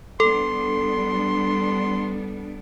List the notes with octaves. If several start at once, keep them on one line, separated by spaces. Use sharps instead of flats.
G3 B3 D4 A4 C6